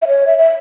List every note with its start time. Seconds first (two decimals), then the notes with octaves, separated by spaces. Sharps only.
0.02 E5
0.08 C#5
0.27 E5
0.38 E5